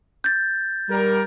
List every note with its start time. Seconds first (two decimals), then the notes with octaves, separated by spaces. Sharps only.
0.24 G6 A6
0.89 G3 A#4